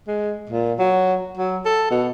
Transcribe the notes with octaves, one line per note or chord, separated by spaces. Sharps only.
G#3
A#2
F#3
F#3
A4
B2